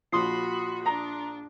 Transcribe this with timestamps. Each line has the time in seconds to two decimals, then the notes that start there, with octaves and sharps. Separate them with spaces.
0.12 A#1 F3 F#4 B5 C6 D#6 C7
0.86 D4 A#5